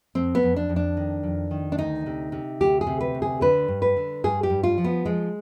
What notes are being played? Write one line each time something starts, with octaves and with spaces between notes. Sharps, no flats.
F2 C4
B3
F2
D4
F2
D4
D#3
F2
D#3
D4
D2 D#4
C3
C3
D2 G4
G#4
C3
B4
D2
G#4
D3 B4
G2
B4
D3
G2 G#4
G4
G2
F4
F3
B3
F3 G#3